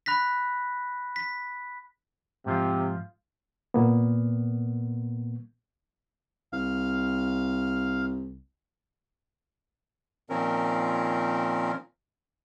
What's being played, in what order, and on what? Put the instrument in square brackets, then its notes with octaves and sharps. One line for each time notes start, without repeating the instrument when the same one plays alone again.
[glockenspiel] B5 F#6 A#6 B6
B6
[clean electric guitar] G#2 F3 F4 [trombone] C3
[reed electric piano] A#2 A#3 B3
[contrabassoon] C2 [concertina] F5
[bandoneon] A#2 D#3 F3 C4 C#4 A#4